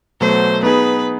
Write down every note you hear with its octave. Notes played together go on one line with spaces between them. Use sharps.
B2 F#3 A3 C5
B3 D#4 G#4 B4